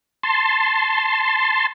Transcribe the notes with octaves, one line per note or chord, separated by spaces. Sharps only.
A5 C6